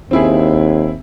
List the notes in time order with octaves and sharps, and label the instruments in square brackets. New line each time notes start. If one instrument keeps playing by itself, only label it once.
[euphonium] D#2 [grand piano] C4 E4 G#4